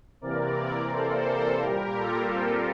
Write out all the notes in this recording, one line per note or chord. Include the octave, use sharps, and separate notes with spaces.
C3 E3 A#3 A#4 D5
A4 C5
A#2 G3 A#3 G4 A#4
F4 A4
C4